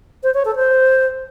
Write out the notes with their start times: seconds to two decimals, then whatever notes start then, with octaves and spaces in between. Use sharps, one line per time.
0.23 C5
0.34 C#5
0.45 A4
0.56 C5